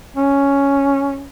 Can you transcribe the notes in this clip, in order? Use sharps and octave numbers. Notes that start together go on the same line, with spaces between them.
C#4